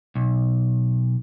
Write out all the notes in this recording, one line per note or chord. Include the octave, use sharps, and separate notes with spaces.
B1